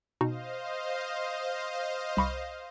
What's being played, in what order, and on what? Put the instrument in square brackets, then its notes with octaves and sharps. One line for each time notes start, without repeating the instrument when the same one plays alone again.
[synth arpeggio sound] B2 D#4 F#4 [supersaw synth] C5 D#5 F5
[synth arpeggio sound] C2 B5 C#6